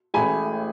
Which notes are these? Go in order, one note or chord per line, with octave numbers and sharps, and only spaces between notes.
A1 A2 G#3 G#5 B5